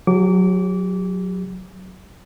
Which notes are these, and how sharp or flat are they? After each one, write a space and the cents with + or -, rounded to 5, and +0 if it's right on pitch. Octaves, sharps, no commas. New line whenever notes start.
F#3 -10 G4 +40 D6 -25